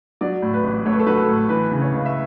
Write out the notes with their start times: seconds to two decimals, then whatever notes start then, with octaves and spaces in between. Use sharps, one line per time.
0.21 F#3 D5
0.42 A2
0.54 B4
0.64 A1
0.85 A3 C#5
0.93 B4
0.99 A4
1.07 F#3 B4
1.17 A4
1.28 A2
1.49 E3 B4
1.71 C#3
1.82 C#5
1.92 C#2
2.06 E5